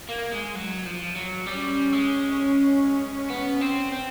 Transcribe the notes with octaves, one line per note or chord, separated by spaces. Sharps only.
A#3
G#3
F#3
F3
F#3
G3 C#4
G#3
B3
C4
C4